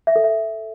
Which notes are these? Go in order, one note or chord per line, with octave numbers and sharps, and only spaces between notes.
E5
A4
E5